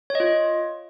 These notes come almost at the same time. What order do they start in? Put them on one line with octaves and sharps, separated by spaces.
C#5 D#5 F4